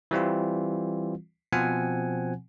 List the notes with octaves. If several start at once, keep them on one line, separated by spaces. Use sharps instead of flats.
E3 G3 C4 F4
B2 F3 C4 F#5 G#5